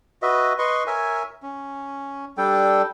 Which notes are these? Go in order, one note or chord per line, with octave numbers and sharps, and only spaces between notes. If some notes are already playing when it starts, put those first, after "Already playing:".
F#4 B4 D#5 E5
B4 D#5 C6 C#6
A#4 C#5 E5 G#5
C#4
G3 D4 A4 G5